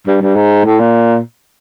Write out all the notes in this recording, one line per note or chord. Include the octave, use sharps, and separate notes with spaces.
G2
G2
G#2
A2
A#2